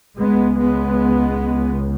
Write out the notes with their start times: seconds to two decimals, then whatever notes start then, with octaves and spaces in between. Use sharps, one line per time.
0.18 C#2 C#3 G#3 B3
0.58 G#3 B3